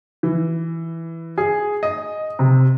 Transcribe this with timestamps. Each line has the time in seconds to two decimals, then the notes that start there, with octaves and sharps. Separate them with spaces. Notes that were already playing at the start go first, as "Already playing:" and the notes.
0.23 E3
1.38 G#4
1.83 D#5
2.39 C3